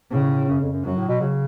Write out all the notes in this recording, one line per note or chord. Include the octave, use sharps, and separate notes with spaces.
A2 C#3
F#2
F2
F#2
F#2 F#3
A2
B2
C#3